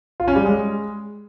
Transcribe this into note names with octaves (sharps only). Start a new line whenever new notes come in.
F4
C#4
G3
G#3